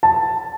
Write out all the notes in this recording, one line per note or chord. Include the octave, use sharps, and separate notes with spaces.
A5